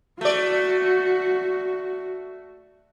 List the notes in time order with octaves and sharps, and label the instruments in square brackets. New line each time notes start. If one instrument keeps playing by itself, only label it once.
[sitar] A3 D5 [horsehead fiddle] F#4